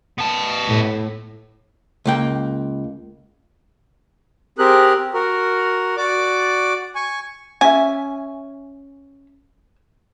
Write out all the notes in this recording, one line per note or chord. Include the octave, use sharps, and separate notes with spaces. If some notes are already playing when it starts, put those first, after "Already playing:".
B3 A5
A2
C#2 A#3 G5
C4 G4 G#4 A#4 F#6
F#4 A#4
F#4 D5 D6
G#5 C#6
C#4 E5 G#5